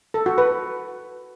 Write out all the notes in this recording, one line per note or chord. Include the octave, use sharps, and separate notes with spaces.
A4
F#4
B4